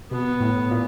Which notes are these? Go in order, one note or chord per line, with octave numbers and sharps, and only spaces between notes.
B2 B3
A2
A#2